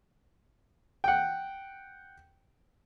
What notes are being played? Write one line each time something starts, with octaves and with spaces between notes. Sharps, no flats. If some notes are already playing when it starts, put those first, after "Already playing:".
F#5 G5